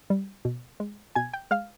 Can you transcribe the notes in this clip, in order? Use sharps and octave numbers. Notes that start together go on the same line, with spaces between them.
G3
B2
G#3
B2 G#5 G#6
G5 G6
G#3 F5 F6